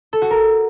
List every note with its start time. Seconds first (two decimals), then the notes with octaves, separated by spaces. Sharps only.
0.13 A4
0.22 F#4
0.31 A#4